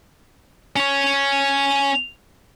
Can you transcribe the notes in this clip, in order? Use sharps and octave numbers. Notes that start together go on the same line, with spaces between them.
C#4 C#5